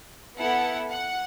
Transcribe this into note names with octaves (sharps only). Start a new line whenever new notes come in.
B3 E4 A4 F#5
F#5